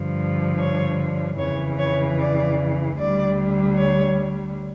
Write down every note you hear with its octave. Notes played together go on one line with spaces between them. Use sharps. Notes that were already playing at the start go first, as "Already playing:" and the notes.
Already playing: G2 D3 F3
C#5
F2 C#3 E3 C#5
C#5
D5
D2 D3 G3 D5
C#5